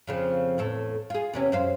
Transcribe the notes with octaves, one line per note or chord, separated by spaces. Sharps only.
F2 C#3 F3
E2 A2 A4
F4 G#4
E2 C3 C#4
F#2 C5 F5